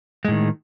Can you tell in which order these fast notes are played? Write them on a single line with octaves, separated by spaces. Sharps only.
G#3 A2 D#3